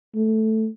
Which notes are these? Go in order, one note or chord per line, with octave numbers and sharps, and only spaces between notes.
A3